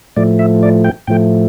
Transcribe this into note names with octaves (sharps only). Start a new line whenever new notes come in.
A2 F3 A3 D5
E5
D5
G5
A2 F3 A3 G5